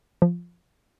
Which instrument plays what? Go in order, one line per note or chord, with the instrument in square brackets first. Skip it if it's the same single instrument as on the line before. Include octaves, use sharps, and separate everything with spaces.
[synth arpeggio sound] F3